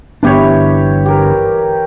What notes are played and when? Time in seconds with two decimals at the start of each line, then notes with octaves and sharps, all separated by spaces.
0.23 G1 E3 B3 D4 G4 C#5
1.06 G4 A#4